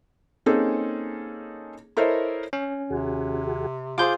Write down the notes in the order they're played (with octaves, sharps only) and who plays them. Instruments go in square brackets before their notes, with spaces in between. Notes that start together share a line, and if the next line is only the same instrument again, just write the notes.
[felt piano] A#3 C4 C#4 D#4 G#4 A4
E4 A4 A#4 C5 C#5 D#5
[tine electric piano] C#4
[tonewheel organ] D#2 F#4 G#4 [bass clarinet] C3
[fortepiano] F4 G#4 C5 [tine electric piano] D6 G6